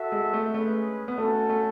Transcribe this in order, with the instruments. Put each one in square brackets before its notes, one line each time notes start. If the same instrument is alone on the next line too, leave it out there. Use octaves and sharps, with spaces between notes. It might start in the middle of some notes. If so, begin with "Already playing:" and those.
Already playing: [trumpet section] F#4 A4 E5
[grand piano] G#3
A3
[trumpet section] G#3 C#4 G#4 B4 [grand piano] A3
[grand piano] B3
[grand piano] A3 [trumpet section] C#4 F#4 A4
[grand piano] A3